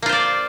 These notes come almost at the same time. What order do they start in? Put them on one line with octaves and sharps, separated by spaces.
A#3 F4 C5 D5